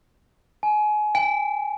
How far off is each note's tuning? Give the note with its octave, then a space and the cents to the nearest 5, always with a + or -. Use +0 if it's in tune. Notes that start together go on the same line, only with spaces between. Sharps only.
G#5 +30
G#5 -45